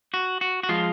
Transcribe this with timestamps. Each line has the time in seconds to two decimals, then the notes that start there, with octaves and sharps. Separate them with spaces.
0.14 F#4
0.41 F#4
0.63 F#4
0.69 F3 G#3 F4